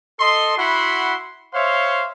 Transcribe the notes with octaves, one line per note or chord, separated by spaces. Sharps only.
A4 D#5 C6
E4 F#4 F#5 B5 C6
C5 C#5 E5 F5 C6